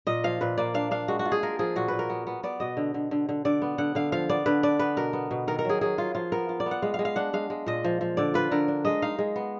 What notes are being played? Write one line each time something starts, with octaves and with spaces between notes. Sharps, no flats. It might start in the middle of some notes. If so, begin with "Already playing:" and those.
A#2 D#5
F3 F5
A#2 B4
A#3 D5
D4 F5
D4 F5
G#3 F#4
F#4
F4
G#4
F4 A#4
F3 G#4
A#2 F#4
A#2 B4
A#4
B3
B3
B3 D5
B2 D#5
D3
D3
D3
D3
D3 D5
B3
D3 F#5
D3 F5
F3 F5
B3 D5
D3 B4
D4 D5
B3 B4
B2 A#4
B3
B2
D#3 A#4
A#4
F#3 G#4
F#3 G#4
F#3 F4
F3 F4
B3 A#4
F4
D5
B3
F#5
G#3 F5
F5
G#3
F5
D4 F#5
G#3 F5
G#3
A#2 D#5
F3
F3
D3 D5
F4 B4
D3 A#4
D4
G#3 D#5
D#4 F5
G#3
B3